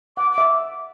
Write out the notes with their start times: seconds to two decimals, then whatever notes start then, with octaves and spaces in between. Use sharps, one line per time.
0.17 F#5 D6
0.32 D6
0.38 E5